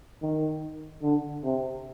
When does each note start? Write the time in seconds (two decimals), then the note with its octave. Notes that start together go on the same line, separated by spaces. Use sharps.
0.22 D#3
1.03 D3
1.44 C3